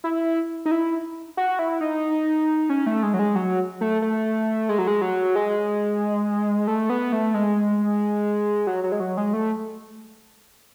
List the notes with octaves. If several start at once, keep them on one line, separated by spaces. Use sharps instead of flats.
E4
D#4
E4
F#4
E4
D#4
C#4
A3
G#3
F#3
G#3
F#3
A3
A3
G#3
F#3
G#3
F#3
G#3
A3
B3
A3
G#3
F#3
F#3
G#3
F#3
G#3
A3